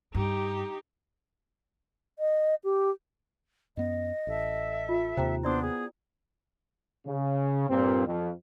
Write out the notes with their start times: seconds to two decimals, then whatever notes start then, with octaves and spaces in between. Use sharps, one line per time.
0.15 G2 D#4 G4
2.19 D#5
2.64 G4
3.77 F#2 B3 D#5
4.27 A1 A4 E5
4.89 F4
5.17 D#2 C3 C5 G5 A#5
5.43 B3 D4 E4 C5 D5 C6 D#6
5.61 G#4
7.07 C#3
7.69 G2 A#2 C4
8.06 F2